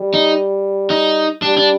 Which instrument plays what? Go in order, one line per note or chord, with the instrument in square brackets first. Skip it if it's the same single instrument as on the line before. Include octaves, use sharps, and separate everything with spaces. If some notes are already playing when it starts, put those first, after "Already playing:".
Already playing: [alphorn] G3
[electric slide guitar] D#4
D#4
[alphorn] G3 [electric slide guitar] D4
[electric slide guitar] D4